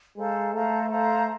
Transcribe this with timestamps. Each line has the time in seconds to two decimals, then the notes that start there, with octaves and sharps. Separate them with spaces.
0.16 G#3 A4 C5 F5 A#5
0.53 A3 A4 C5 F5 A#5
0.90 A4 C5 F5 A#5